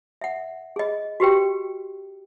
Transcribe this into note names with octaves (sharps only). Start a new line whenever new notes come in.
E5 F#5
G#4 D#5
F#4 G4 B4 G5